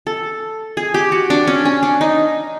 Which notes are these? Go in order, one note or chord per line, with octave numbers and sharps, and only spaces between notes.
A4
G#4
G4
F#4
D4
C#4
C#4
D4
D#4